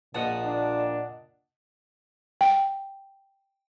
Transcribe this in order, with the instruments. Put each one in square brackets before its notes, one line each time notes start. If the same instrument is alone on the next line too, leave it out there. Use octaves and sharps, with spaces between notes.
[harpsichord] A#1 F3 D#6 [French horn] A#2 [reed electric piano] D#5 F#5 A5
[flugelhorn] D4
[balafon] G5